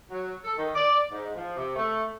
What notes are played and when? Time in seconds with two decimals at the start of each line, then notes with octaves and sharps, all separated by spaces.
0.11 F#3
0.44 A4
0.57 D#3
0.75 D5
1.11 G#2
1.36 F3
1.56 C3
1.76 A3